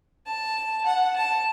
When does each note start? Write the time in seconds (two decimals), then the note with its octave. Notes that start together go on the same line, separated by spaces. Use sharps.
0.26 A5
0.86 F#5
1.16 A5